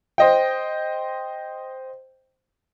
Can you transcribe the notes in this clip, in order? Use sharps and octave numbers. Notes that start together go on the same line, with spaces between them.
C5 D#5 G5